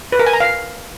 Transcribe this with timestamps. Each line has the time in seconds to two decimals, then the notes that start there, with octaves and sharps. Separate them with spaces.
0.12 B4
0.19 A#4
0.26 G#5
0.33 A#5
0.40 F5